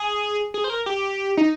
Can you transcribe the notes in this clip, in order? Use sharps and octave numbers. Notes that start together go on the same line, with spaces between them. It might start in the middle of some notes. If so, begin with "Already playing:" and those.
Already playing: G#4
G#4
C5
A#4
G4
D#4